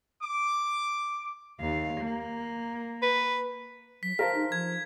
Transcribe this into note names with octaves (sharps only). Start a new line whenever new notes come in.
D6
D#2 F5
A#3
B4
F#3 B6
A#4 C5 F5 A5 B6
D#4
F3 G#6